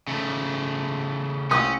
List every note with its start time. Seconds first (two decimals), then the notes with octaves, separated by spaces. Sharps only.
0.08 C#3 A3
1.51 C2 C#4 D#6